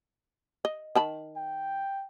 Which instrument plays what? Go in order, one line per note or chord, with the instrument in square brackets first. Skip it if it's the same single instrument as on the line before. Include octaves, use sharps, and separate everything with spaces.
[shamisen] D#5
D#3 A5 B5
[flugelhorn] G5